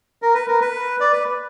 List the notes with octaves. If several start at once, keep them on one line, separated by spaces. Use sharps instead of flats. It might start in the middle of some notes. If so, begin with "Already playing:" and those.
A#4
B4
A#4
B4
D5
B4